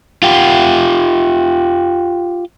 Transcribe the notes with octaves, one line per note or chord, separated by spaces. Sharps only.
F4 G4